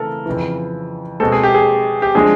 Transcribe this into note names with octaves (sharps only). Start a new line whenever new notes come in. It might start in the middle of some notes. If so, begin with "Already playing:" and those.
Already playing: C#3 E3 A3 A4 A#4
F2 C#3 E3
B2 G#3 C4 A4
G#4
G4
G#4
G4
D3 F3 G#3 C4 G#4